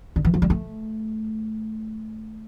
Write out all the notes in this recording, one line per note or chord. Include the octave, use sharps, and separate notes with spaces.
D3
E3
F3
G3
A3